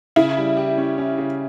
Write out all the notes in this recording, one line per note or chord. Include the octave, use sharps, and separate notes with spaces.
C#3 E4
G3
G4
C#4
C#4
C#3